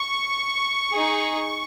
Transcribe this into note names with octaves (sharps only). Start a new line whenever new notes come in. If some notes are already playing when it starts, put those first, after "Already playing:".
Already playing: C#6
D#4 G#4